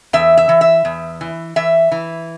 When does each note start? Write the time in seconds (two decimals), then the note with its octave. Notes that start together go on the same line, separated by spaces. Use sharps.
0.13 E2 E5
0.37 E5
0.49 E3
0.61 E5
0.85 E2
1.21 E3
1.56 E3 E5
1.92 E3